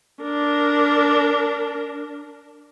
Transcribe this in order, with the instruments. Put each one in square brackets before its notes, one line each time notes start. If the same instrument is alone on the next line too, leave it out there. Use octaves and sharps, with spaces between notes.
[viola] D4 A#4